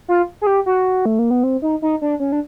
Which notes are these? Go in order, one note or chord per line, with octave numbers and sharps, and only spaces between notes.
F4
G#4
G4
F#4
A3
A#3
B3
C4
D#4
D#4
D4
C#4
D4